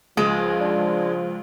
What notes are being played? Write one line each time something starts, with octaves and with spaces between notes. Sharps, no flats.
C#2 F3 G#3
D4